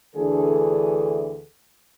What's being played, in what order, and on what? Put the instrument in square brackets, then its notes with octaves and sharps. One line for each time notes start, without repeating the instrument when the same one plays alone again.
[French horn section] D2 D3 E3 G#4 A4